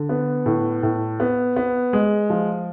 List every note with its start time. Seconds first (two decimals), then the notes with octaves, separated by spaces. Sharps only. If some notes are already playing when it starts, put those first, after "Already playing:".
Already playing: D3
0.09 B3
0.46 A2
0.83 A2
1.20 B3
1.56 B3
1.93 G#3
2.30 F3